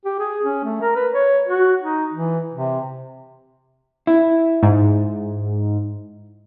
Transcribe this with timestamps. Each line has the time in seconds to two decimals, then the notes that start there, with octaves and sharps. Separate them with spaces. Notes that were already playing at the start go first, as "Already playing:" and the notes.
0.05 G4
0.19 G#4
0.43 C#4
0.64 A3
0.81 A#4
0.96 B4
1.13 C#5
1.48 F#4
1.80 D#4
2.13 E3
2.52 C3
4.07 E4
4.63 G#2